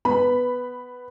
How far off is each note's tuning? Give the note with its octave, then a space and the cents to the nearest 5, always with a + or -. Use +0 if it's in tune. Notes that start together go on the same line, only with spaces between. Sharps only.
B3 +0 B5 +0